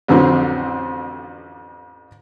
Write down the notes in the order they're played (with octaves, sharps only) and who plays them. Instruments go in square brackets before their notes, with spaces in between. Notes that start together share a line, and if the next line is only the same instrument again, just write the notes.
[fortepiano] A1 F2 D3 F#3 C4